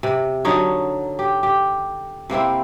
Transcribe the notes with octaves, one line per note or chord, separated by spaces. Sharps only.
C3
D3 F#3 D#4 C#5
G4
G4
C3 A#3 C4 E4